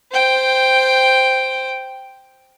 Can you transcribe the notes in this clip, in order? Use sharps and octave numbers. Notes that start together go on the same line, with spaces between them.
C5 G5